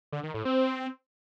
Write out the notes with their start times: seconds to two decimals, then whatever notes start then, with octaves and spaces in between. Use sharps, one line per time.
0.12 D3
0.23 D#3
0.34 A2
0.45 C4